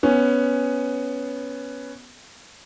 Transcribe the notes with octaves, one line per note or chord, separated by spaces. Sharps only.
B3 C#4